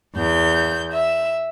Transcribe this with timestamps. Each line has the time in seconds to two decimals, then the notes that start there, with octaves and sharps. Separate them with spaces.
0.14 E2 G6
0.92 E5